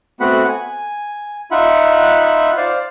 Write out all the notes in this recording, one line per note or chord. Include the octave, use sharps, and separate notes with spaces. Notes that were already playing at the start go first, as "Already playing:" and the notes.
A3 B3 C4 F#4 F#5 B5
G#5
D#4 F4 E5 F#5 B5
C5 D5 F5